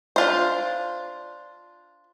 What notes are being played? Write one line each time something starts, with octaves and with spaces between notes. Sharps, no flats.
D4 F4 C5